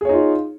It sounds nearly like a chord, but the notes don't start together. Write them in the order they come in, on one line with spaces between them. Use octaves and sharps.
G#4 C#5 D#4 F4